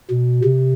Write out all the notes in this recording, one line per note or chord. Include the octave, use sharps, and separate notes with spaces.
B2
C3